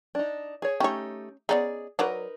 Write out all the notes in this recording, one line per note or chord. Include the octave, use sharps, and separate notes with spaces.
D4 D#4
G#4 C#5
A3 C#4 D#4 G4 C#5
B3 C#4 D#4 G#4 D5
F#3 D#4 A#4 B4 C#5 D5